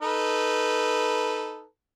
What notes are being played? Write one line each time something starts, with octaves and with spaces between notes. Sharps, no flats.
D#4 A4 B4